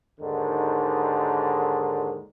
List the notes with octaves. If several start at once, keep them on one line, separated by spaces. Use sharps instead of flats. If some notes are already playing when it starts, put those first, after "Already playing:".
D#2 G#2 D3 D#3